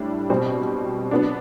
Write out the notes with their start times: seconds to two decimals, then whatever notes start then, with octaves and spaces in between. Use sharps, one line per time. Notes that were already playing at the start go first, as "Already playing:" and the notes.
Already playing: A2 G3 D4
0.30 B2 G3 C4
1.11 F#3 B3 D4